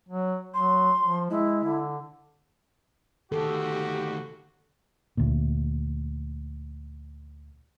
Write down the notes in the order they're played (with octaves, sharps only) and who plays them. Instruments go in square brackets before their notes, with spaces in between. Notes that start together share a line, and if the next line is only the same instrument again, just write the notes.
[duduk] F#3
[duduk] F#3 [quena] C6
[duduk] F3
[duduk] G#3 [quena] E4
[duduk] D3
[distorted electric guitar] D2 D#3 [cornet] F#4 [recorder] G4 [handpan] A4
[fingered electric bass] D2 A#2